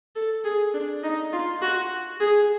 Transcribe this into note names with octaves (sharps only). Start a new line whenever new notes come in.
A4
G#4
D4
D#4
F4
F#4
G#4